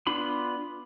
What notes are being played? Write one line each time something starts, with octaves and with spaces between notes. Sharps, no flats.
B3 D4 F4 B5 C6